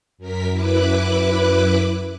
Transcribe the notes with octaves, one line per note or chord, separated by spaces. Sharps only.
F#2 A#4 B6
F#2 E4 B4 D6 F#6